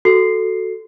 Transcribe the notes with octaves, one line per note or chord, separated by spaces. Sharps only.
F#4 A4 C7